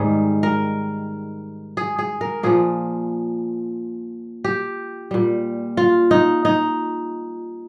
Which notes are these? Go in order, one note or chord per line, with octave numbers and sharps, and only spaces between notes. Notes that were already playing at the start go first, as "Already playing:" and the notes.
Already playing: G#2 D#3 G3 G#4
A#4
G#4
G#4
A#4
A#2 F3 G#4
G4
A#2 G3
F4
D#4
D#4